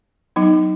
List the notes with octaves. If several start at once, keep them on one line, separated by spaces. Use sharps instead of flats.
F#3 B3 D#4